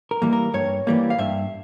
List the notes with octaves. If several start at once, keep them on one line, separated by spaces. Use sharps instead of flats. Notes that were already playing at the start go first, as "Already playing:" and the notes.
A#4
E3 G3 A#3
A#4
G2 C#5
E3 G3 A#3
F5
G2 E5